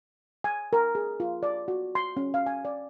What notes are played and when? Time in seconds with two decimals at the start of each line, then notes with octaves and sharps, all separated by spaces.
0.44 G#5
0.73 A#4
0.95 G#4
1.20 F4
1.43 D5
1.68 F#4
1.95 C6
2.17 C#4
2.34 F5
2.46 G#5
2.65 D5